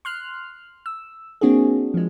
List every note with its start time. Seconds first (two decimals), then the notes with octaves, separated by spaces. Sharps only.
0.05 C6 F6 F#6
0.86 E6
1.41 A#3 C4 D4 F#4 G#4
1.94 F3 G#3